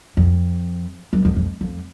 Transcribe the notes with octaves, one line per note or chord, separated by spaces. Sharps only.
F2
F#2
F2
F2
F2